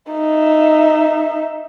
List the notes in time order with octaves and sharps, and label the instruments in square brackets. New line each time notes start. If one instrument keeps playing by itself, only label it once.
[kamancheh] D#4 E5